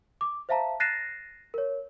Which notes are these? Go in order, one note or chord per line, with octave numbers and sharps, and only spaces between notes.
D6
C5 E5 F5 A5 A#5
F#6 A6 A#6 C7 D#7 E7
A#4 C#5